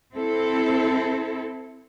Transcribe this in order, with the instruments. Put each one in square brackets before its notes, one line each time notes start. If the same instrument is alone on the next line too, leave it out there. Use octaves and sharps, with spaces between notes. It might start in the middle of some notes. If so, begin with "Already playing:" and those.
[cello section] C4 E4 A4